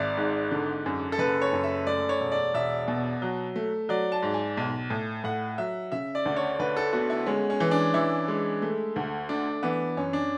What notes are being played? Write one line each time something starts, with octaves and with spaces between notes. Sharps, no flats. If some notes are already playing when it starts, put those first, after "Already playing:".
Already playing: G#1 D5 E5
G#2
D3
F#2
A4
F#1 B4
C#5
F#2
E5
A3 D5
C#5
E1
D5
E1 E5
B2
F#3
A3
F#3 D5
A5
G#2
G#5
B1
A2
A2 F#5
F#3 E5
C#3 E5
D5
D2
C#5
D2 B4
A4
B3 F#4
E4
G#3 C#4
C#4
E3
D4
E3 E4
G#3
A3
D2
A3 D4
E3 B3
F#2 C#4
D4